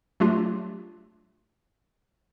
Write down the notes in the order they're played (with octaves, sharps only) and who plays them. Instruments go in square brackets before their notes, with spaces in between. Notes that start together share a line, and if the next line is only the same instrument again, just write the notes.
[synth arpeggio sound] F#3 A3 D4 F4 G4